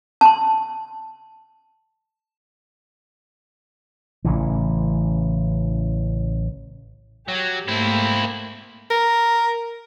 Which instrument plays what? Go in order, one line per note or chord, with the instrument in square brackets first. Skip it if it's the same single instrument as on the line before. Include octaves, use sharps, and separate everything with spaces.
[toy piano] A5 C6
[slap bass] A1 C#3 E3
[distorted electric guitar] F#3 [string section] G4
[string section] G#2 A3 A#3 [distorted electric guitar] C4 E4
[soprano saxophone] A#4